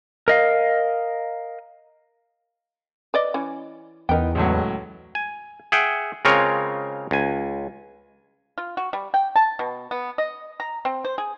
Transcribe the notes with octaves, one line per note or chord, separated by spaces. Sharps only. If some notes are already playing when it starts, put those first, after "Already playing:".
A#4 D#5 F5
B4 D5 D#5
E3 C#4
E2 B3 D#4 A#4 G5
C#2 A2 F#3
G#5
G#4 E5 F#5 G5
C#3 G#3 C4 F4 A#4 C#5
C#2 G#5
F4
F#4
G3
G5
A5
B2
B3
D#5
A#5
C4
C5
G#4